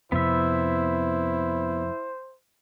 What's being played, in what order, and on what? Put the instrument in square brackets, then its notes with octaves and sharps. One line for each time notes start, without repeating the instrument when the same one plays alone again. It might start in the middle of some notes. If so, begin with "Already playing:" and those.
[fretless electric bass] F2 C3 [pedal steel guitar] B3 E5 [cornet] E4 [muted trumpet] C5